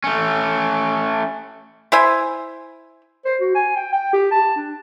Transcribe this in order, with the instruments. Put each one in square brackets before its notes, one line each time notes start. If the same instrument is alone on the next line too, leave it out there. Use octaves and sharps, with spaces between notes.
[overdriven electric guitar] A3 C#4
[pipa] E4 C5 E5 G#5
[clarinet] C5
F#4
G#5
G5
G5
G4
A5
D4